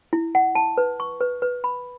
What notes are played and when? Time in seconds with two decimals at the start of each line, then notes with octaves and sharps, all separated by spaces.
0.13 E4
0.35 F#5
0.55 A5
0.78 B4
1.00 C#6
1.21 B4
1.42 B4
1.64 B5